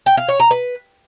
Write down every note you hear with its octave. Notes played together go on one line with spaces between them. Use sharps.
G5
F5
C#5
A#5
B4